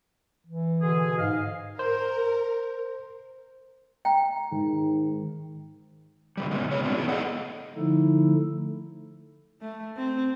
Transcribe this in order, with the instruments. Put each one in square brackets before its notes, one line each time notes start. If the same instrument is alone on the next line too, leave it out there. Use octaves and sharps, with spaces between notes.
[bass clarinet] E3
[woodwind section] B2 D3 G#4
[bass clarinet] G#2 [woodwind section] D#5 F5
[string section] A#4 [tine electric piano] C5
[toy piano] G5 A#5
[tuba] G#2 [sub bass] D#3
[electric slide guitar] B2 D3 G3
C#3 G#3 A3 B3
A2 C3 D4 C#5
F#3 G#3 C4 D4
B3 E4 G#4
G#4 A4 D#5 F5 F#5
[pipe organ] D3 F3 A3 D#4 E4 A4
[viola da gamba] A3
C4